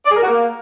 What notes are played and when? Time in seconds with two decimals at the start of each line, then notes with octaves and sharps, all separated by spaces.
0.05 D5
0.11 G#4
0.16 A#4
0.21 F#4
0.27 A#3